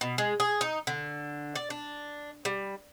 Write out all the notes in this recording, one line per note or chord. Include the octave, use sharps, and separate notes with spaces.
B2
G#3
G#4
D#4
D3
D5
D4
G3